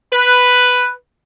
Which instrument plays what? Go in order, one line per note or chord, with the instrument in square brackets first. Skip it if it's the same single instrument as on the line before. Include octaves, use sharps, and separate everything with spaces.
[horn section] B4